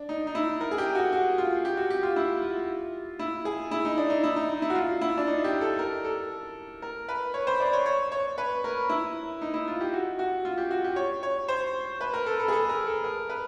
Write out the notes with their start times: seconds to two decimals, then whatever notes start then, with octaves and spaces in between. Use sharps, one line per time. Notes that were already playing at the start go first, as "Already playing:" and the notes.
Already playing: D4
0.09 D#4
0.27 D#4
0.35 E4
0.61 A#4
0.71 G#4
0.78 G4
0.95 F#4
1.13 F#4
1.38 F4
1.65 G4
1.77 F#4
1.90 G4
2.03 F4
2.16 E4
2.42 F4
3.19 E4
3.45 G#4
3.71 E4
3.85 D#4
3.98 D4
4.10 D#4
4.24 E4
4.36 D#4
4.49 D#4
4.62 E4
4.70 F#4
4.75 F4
5.01 E4
5.17 D4
5.27 D#4
5.44 G4
5.61 A4
5.79 A#4
6.04 A4
6.82 A#4
7.09 B4
7.34 C#5
7.47 C5
7.60 D5
7.73 C#5
7.86 C#5
8.12 C#5
8.38 B4
8.64 A#4
8.90 E4
9.42 D#4
9.54 E4
9.68 F4
9.81 G4
9.94 F#4
10.19 F#4
10.45 F4
10.58 G4
10.71 F#4
10.84 G4
10.96 C#5
11.23 C#5
11.48 C5
12.01 B4
12.13 A#4
12.26 A4
12.40 A4
12.48 G#4
12.52 A4
12.69 A#4
12.87 A4
13.04 A#4
13.29 B4